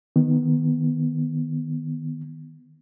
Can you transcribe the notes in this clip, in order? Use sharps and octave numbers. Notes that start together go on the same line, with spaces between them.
D#3 B3